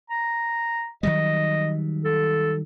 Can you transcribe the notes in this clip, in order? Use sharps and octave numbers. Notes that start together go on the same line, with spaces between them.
A#5
D#3 F#3 G3 D#5
A4